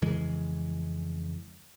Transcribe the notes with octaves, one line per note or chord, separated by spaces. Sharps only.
F2 C#3 E3 G#3